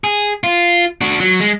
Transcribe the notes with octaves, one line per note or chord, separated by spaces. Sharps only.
G#4
F4
D4 F#4
F#3
G#3